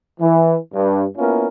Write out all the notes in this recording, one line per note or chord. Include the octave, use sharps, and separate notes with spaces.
E3
G2
A#3 B3 C#4 E4 F4 A#4